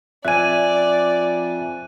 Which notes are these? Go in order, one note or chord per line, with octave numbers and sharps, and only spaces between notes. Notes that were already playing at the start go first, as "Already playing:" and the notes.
F2 D5 E5 G#5 F#6 D#7